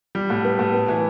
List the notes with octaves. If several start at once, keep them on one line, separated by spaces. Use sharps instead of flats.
G3
A2
B3
A2
B3
E3